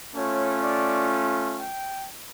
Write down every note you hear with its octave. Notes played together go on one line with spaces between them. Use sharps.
A3 C#4 F4 C#5
D5
G5